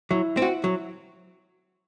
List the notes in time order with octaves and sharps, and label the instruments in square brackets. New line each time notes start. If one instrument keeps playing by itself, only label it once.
[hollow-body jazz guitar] F#3 [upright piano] E4
[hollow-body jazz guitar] C4 F#4
F#3